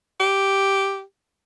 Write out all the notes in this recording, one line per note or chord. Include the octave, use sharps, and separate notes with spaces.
G4